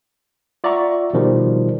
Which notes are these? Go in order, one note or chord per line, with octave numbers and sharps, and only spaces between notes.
F4 D5 E5 F#5 A#5 C#6
B2 D#3 F3 G3